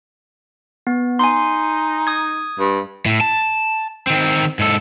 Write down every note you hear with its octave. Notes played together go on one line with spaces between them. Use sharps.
B3
D#4 G#5 C6
D#6 G#6
G2
A2
A5
D#3 C4
G#2 A4